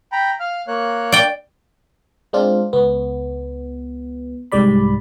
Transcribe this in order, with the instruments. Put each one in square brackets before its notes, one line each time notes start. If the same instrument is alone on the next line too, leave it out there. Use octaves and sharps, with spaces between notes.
[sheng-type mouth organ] G5 A#5 B5
F5 F6
A#3 C#5 F#6
[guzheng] D5 G5
[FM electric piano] G#3 C4 D4 F4
C#2 B3
C2 G#2 G3 D5 B5